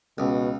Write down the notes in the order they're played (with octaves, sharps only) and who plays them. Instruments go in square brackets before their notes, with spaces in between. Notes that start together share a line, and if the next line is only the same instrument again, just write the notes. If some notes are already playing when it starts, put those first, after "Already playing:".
[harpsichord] C#2 [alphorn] B2